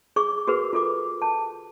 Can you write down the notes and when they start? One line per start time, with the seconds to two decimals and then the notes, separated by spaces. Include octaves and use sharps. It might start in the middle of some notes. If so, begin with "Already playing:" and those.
0.16 G#4 C#6 D6
0.48 F#4 G#4 A#4 B4
0.73 F4 A4 D6
1.22 A5